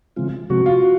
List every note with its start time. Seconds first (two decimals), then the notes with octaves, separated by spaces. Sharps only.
0.16 C#3 E3 G#3 C4 F4
0.50 C3 F3 G#3 C4 F#4
0.66 F4
0.83 F#4